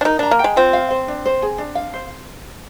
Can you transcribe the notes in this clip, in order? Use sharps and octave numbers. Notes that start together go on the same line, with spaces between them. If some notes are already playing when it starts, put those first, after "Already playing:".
D4
D#4 A#4
D4 A#5
A#3
G5
G#3
C4 F4
F5
C5
D4
C5
G#4
D4
F5
C5